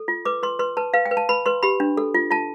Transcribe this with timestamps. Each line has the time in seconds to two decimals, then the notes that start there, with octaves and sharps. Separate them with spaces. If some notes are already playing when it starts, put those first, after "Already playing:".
Already playing: A4
0.08 F4
0.25 B4 D6
0.43 B4 C6
0.59 B4 C6
0.77 B4 A5
0.94 B4 F5
1.06 G5
1.11 B4
1.17 A5
1.29 B4 B5
1.46 B4 C6
1.63 G4 B5
1.80 D4
1.97 A4
2.14 F4
2.31 F4 A5